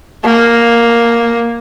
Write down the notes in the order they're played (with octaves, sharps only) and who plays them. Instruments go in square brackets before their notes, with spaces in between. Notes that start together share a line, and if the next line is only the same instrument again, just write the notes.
[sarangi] A#3